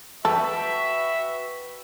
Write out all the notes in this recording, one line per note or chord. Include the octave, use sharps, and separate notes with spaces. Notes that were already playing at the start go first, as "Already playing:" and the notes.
F#4 A4 B4 E5 G5